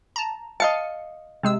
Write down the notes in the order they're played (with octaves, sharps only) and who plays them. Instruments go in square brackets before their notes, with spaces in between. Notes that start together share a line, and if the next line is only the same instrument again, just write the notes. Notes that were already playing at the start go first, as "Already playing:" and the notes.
[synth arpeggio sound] A5 A#5
[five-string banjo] D#5 F5 A5 [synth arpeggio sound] C#7
[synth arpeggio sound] C3 G#3 E6